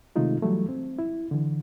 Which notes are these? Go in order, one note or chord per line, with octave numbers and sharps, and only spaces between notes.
C3 D#3 G#3 A3 D#4 F4
E3 F#3 G3 A3
C4
E4
D3 E3